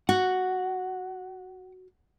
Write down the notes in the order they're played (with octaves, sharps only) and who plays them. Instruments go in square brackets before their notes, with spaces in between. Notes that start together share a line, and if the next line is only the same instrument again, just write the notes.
[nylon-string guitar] F#4 [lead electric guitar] F#5